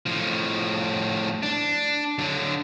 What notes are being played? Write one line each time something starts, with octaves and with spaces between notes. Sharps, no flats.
A2 F3
D4
D3 F#3